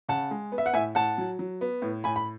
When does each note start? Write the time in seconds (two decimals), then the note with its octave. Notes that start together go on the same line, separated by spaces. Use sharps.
0.08 C#3 F#5 A5
0.31 G#3
0.52 B3
0.58 E5
0.66 F#5
0.74 A2 E5 G#5
0.95 A2 F#5 A5
1.18 F#3
1.39 F#3
1.61 B3
1.82 A2
2.04 A2 G#5 B5
2.16 B5